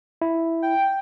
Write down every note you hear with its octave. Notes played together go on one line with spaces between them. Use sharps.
E4
G5